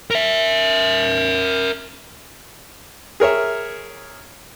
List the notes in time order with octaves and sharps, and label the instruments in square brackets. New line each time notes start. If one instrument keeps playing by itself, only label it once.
[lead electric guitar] A#4 E5
[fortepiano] G#4 A#4 C#5 E5